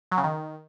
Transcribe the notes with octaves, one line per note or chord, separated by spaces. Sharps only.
F#3
C#3
D#3